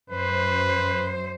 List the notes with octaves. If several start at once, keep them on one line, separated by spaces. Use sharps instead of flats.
F#2 B4 C5